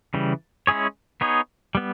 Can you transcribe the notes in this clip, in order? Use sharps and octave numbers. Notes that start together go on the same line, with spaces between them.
C#3 E3 G3
G#3 C#4 E4 G#4 C#5
B3 D#4 G#4 C#5
G3 B3